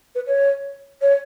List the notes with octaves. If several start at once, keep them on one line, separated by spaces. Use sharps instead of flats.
B4
C#5
C#5